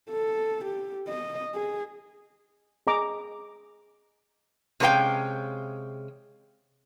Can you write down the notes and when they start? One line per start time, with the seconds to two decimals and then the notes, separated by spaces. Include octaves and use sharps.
0.11 A4
0.65 G4
1.08 D#5
1.55 G#4
2.87 G#4 D#5 A#5 D6
4.80 C3 G#3 C#4 A#4 F5 G5